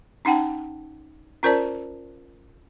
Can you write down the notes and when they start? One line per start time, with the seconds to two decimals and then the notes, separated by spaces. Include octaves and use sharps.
0.25 C#4 D#4 F#5 G5 A5
1.43 C#4 F4 A#4 C5 D5 A5